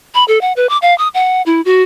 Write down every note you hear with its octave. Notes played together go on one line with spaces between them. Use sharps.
B5
A4
F#5
B4
D6
F5
D#6
F#5
E4
F#4